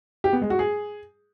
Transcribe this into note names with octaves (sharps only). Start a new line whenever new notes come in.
G4
B3
G#3
F#4
G#4